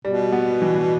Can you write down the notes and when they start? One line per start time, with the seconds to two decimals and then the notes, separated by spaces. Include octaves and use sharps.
0.05 B2 G3
0.32 B3
0.62 E3